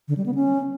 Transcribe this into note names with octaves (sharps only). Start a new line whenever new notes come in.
D3
G3
B3
C#4